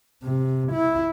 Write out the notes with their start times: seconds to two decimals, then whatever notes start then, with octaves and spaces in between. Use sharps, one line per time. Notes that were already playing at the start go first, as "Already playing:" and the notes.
0.23 C3
0.72 E4